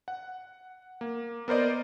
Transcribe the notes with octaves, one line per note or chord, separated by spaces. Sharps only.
F#5
A#3
B3 A#4 C5 D5 D#5